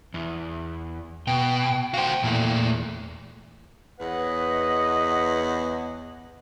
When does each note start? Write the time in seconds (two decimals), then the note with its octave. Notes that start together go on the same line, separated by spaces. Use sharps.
0.14 E2
1.27 B2 G5
1.94 F#4 C5 F5 G5
2.23 E2 A#2 A3
4.00 E2 B4 C#5 D#5 F#5